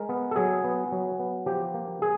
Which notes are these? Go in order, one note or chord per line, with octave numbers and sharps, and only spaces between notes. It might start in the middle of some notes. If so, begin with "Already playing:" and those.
Already playing: G#3 A#4
B3
A4
F#3 G#4
B3
F#3
B3
F3 G4
A#3
G#4